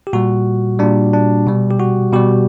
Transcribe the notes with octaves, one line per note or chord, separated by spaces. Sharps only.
G4
A#2 G3 F#4
A#2 G3 D4
D4
B2 G3
G4
F#4
B2 G3 G4